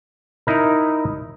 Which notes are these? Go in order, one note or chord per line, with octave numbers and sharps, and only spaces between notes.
D#4 E4 A#4